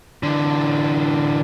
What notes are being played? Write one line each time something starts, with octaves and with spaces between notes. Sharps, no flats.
D3 E3